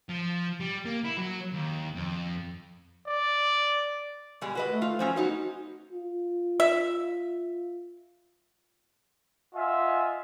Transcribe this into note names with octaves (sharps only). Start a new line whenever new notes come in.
F3
G3
A#3
E4
F#3
D#2
F2
D5
B2 G3 G#3
F#4 B4 D#5
A3
F4
F3 F#3 C#4 C5
B3 D#4 F#4 C5
F4
E5
F4 D#5 E5 F#5 G#5